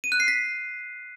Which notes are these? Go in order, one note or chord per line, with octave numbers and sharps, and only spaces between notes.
D#7
F#6
C7
B6